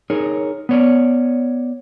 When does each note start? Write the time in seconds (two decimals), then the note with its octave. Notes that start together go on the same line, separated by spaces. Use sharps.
0.10 D#4 G#4 A#4 C#5
0.69 B3 C#5 D5